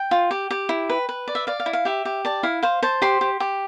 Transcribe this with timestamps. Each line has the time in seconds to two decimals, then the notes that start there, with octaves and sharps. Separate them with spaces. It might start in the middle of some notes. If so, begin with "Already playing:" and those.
Already playing: G5
0.11 F4
0.31 G4
0.51 G4
0.69 E4
0.90 B4
1.09 B4
1.28 D5
1.35 E5
1.47 D5 F5
1.60 F5
1.66 E4
1.73 F5
1.85 G4 E5
2.05 G4
2.25 D5 A5
2.43 E4 F5
2.63 C5 F5
2.83 C5 A5
3.02 G4 C6
3.21 G4
3.40 G4